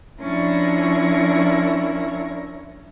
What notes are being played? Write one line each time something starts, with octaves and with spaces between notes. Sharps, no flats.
F3 C#4 D4 E4 A#4 C#6